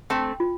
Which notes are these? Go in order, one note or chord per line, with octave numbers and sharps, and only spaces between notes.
A3 C4 G5
F4